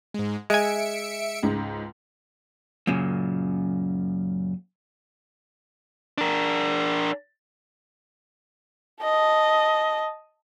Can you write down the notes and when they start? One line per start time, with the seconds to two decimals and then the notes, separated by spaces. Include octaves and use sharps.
0.14 G#2 G#3
0.50 G#3 E5 G#5 C#7 D7
1.43 C#2 G#2
2.87 F#2 A#2 C#3
6.18 D4 A#4
9.03 D#5 A5